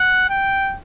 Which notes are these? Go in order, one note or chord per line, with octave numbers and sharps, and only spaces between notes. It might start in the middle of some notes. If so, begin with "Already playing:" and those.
Already playing: F#5
G5